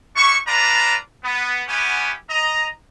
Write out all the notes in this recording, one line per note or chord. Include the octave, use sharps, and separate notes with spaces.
D4 E4 G4 C#6
D4 F4 B4 D5 A5 A#5
B3
B3 C#4 E4 G4 F#5 G#5
D#5 A#5